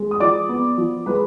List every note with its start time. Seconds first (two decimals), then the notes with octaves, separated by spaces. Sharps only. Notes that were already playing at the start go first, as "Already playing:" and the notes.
Already playing: G#3
0.11 D#6
0.20 F3 D5 D6
0.49 B3
0.78 F3
1.06 G#3 B4 B5